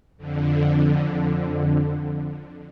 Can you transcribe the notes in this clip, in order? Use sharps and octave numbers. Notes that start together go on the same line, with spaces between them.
F2 D3